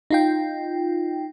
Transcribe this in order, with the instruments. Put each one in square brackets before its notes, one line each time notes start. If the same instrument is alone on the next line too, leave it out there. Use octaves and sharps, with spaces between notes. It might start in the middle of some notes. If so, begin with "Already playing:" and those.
[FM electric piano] D#4 F4 G5